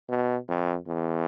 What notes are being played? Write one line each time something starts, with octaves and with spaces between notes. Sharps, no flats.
B2
F2
E2